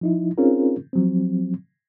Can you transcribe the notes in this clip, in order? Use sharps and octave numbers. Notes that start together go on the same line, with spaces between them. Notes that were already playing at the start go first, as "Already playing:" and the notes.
F3 D#4 E4
C4 C#4 D#4 F4 G#4 A#4
F3 F#3 C4